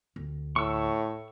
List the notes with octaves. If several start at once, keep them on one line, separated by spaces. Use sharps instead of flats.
D2
A2 C#6 E6